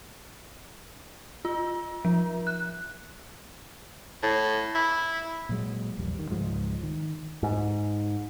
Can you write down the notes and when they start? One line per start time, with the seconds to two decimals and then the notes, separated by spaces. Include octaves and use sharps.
1.45 F4
2.05 F3
2.47 F#6
4.23 A2
4.75 E4
5.49 A#2 F#3 G#3
5.98 A#1 E2 G3
6.19 D#3
6.30 C#2 G#2 F3 G#3
6.83 D#3
7.43 G#2